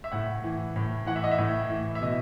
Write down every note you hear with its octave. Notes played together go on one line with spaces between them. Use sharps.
E5
A2 F#5
E3
A2
E3 F#5
E5
D#5
E5
A2
E3
E5
B2 D#5